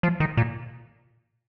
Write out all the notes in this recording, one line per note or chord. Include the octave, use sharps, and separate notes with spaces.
F3
D#3
A#2